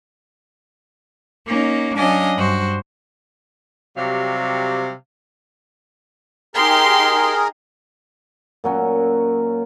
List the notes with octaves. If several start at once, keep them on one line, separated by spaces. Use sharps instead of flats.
A#3 C#4 D#4
F#3 C#4 D4 D#5 F5 G#5
G2 F#4 C5
C3 F#3 G3 F5
D#4 G4 G#4 A#4 C6
A#2 F#3 C#4